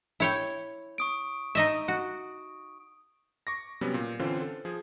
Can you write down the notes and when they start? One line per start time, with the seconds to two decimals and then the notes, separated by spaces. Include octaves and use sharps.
0.20 E4 C#5 G5
0.98 C#6 D#6 D7
1.55 D#4 D#5 E5
1.88 F#4
3.47 C#6 D6 A#6
3.81 C3 F#3 G3 B3 C#4
3.94 A#2
4.19 D3 E3 C4 C#4 F4 C5
4.42 A4
4.65 F3 G#4